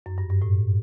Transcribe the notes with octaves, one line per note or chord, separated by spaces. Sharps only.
F#2
G2
G2
A2